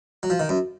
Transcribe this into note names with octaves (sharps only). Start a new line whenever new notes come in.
F#3
F3
D#3
F#2